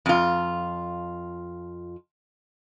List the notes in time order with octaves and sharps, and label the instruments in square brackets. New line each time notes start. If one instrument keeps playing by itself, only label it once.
[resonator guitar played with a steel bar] F2 F4